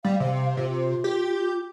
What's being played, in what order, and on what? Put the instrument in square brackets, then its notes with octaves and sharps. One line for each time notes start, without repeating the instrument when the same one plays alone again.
[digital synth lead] G3 [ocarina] F5
[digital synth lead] C3 [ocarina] F5
[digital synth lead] C3 [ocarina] F4
[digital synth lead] G4